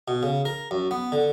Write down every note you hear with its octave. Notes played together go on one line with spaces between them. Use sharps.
B2
C#3
A#4
F#2
B3
D3